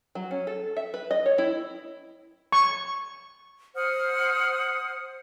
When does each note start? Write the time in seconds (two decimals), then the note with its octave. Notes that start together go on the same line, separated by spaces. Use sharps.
0.15 F#3
0.31 C#4
0.47 A4
0.77 E5
0.94 B4
1.11 D#5
1.26 C#5
1.38 E4
2.52 C#6
3.75 C5 F#5 D#6 F6